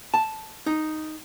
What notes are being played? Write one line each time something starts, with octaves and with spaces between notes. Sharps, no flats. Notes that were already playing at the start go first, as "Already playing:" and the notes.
A5
D#4